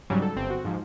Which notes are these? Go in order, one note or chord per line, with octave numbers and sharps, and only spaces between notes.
G#2 C#3 F#3 G3
A4
G1 C4
F#4
G#2 F3